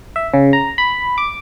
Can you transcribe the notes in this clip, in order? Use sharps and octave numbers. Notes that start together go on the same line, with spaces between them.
E5
C#3
A#5
B5
D6